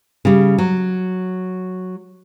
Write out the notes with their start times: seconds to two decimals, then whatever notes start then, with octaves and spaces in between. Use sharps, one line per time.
0.25 C#3 G3
0.58 F#3